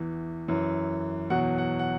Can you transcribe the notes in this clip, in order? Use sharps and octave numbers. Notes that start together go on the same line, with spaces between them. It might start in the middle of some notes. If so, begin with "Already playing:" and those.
Already playing: E2 E3
F#2 E3
E2 B2 F#3 F#5
F#5
F#5